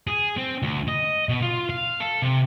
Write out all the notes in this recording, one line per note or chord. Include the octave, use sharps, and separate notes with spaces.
G#4
C4
D2
D#5
B2
F4
F5
A4
C3